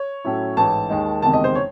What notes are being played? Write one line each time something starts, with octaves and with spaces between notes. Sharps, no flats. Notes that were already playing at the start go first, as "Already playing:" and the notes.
Already playing: C#5
A2 F#3 C#4 E4
A1 G#2 E3 A5
D#2 D#3 G#3 D#4
F#1 E2 C3 D#3 G#3 A5
D#5
C5
C#5